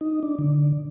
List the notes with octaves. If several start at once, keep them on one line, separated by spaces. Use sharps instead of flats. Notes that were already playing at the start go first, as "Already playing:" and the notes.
D#4
D4
D3